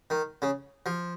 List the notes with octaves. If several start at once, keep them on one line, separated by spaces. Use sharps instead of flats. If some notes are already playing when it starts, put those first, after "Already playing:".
D#3
C#3
F3